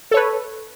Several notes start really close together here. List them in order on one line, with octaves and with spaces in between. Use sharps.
A4 C#5 B4